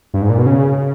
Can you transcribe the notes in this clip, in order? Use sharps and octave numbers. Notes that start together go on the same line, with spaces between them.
G2
G#2
A#2
B2
C#3